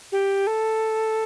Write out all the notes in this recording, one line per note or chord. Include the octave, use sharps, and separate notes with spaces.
G4
A4